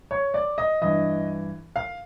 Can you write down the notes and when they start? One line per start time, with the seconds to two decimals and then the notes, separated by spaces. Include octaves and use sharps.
0.11 C#5
0.34 D5
0.58 D#5
0.81 G2 E3 D#5
1.76 F5